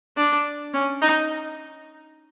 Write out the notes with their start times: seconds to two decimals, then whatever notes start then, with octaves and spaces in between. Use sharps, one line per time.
0.17 D4
0.73 C#4
1.02 D#4